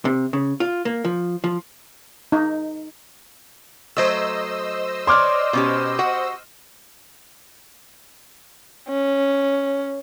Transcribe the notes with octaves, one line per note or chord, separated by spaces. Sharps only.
C3
C#3
F4
A#3
F3
F3
D#4
F#3 A3 C5 D#5 E6
C#5 D5 C6 D6 F6
B2 C#4 G4
F#4 F#5
C#4